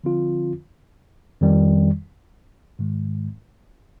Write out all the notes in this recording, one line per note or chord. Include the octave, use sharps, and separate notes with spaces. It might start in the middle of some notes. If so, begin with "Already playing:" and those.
D3 F3 C4 F4
F2 D#3 G3
G#2 D#3 G#3